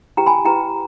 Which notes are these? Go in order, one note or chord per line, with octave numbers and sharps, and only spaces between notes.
E4 G4 B4 G5 A#5
G#5 B5
E4 G4 B4 G5 A#5